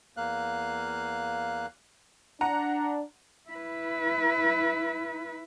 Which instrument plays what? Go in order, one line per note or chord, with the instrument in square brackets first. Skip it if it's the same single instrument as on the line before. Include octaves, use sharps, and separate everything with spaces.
[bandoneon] E2 A#3 F5 F#6
[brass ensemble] D4 [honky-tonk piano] F#5 A#5
[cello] E4 B4